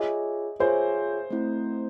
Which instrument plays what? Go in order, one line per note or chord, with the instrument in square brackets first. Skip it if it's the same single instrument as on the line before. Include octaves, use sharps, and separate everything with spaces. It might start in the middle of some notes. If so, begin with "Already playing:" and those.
Already playing: [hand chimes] F4 G#4 C#5 E5 G#5 [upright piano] D#5
[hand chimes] F4 G#4 C#5 E5 G#5 [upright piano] C5
[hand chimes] A3 C4 E4